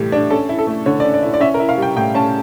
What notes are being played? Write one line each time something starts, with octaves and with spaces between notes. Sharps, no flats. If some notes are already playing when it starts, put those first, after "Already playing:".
Already playing: A2 E3 G3 G4
D4
C#4 A4
E4
A4
A3
D3 C#5
D5
C#4
D5
E4
D5
C#4 E5
A#4
E4
F5
G3 G5
A2 G5
C#4 A5